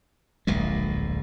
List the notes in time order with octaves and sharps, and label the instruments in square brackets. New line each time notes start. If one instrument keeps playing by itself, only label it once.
[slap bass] D1 A#1 A#2 G#3